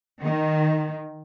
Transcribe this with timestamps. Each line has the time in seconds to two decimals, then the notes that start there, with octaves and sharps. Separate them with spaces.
0.23 D#3